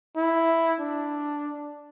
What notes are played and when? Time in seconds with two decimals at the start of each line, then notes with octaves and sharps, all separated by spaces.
0.17 E4
0.80 D4